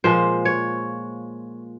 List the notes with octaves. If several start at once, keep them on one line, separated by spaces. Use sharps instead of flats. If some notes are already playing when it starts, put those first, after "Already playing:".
A#2 F3 G#3 C5
C#5